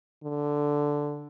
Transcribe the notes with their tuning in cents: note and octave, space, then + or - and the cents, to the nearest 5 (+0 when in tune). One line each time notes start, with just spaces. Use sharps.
D3 +0